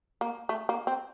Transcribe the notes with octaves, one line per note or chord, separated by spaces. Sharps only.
A#3
A3
A#3
C4